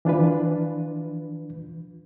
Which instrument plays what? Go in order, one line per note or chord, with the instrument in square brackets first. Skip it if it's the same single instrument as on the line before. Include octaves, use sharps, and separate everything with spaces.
[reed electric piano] E3 D4 F4 B4